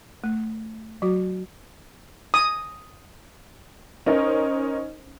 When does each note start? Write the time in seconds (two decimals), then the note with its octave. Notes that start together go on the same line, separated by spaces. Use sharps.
0.24 A3
1.02 F#3 F#4
2.34 D#6
4.06 C#4 D#4 A#4 C5 D#5